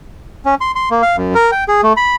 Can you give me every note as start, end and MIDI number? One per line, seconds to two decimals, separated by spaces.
0.45 0.55 61
0.61 0.72 84
0.76 0.89 84
0.91 1.02 58
1.02 1.16 77
1.17 1.35 42
1.35 1.51 70
1.52 1.64 79
1.68 1.81 68
1.83 1.93 57
1.97 2.16 83